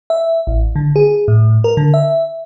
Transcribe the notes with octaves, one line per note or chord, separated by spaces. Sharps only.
E5
A1
D3
G#4
A2
A#4
D3
E5